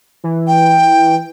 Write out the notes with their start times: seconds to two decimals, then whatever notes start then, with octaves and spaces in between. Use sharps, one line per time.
0.24 E3
0.47 G5